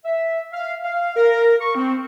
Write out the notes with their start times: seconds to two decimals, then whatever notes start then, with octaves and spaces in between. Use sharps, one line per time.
0.05 E5
0.53 F5
0.84 F5
1.17 A#4
1.60 C#6
1.76 C4